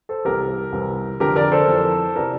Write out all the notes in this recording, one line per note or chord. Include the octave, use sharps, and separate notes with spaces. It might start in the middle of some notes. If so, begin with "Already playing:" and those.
A4 C5
C2 C3 E3 G4 A#4
C2 C3 E3
F2 D3 F3 G4 A#4
A#4 D5
A4 C5
F2 E3
C3 E3 A#4 D5